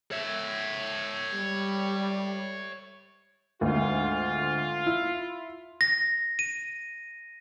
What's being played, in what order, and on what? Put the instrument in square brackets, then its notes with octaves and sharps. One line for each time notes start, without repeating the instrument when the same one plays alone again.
[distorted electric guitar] C#5 E5
[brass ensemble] G3
[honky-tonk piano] G#1 D2 [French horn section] F4
[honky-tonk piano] E4
[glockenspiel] A#6
D#7